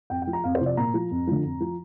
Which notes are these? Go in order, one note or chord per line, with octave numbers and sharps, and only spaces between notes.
F2 G5
G5
F3
A#5
F2 F5
C5
C3 F3
D5
A#2 A#5
F3
F2
D3 F3
F2
F3